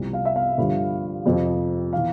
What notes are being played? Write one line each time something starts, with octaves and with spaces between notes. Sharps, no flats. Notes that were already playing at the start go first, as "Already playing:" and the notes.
Already playing: C2 C3 F3
F5
E5
F5
G2 D3 F3
F2 C3 F3
E3 F5